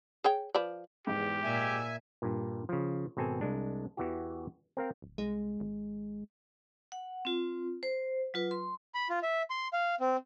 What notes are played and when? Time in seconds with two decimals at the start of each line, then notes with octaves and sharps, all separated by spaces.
0.24 G#4 C#5 G5
0.54 F3 B4 D5
1.07 E2 G#2 G4
1.44 A#2 E5 G#5
2.22 G2 A#2
2.69 C#3 F3
3.17 G#1 B2 C4 A4 G#5
3.41 C2 G#3 D4
3.97 E2 E3 F#4 G4
4.77 C4 A#4 F5 G5
5.02 D1
5.18 C2 G#3
5.60 G#1
6.92 F#5
7.25 C4 F4
7.83 C5
8.34 F#3 F4 B4
8.51 C6
8.94 B5
9.10 F4
9.23 E5
9.50 C6
9.73 F5
10.00 C4